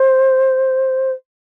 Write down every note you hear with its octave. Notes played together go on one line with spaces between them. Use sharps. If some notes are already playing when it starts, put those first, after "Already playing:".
Already playing: C5